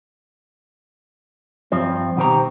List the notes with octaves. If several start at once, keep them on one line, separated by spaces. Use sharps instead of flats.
G2 F3 C4
B2 D#3 G4 C5 A#5